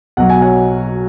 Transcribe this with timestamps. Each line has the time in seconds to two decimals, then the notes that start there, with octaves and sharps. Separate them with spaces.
0.17 B1 B2 F#3 F#5
0.30 G#5
0.42 C#5 F#5